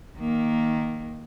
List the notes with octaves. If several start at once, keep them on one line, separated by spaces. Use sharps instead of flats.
D#3 A#3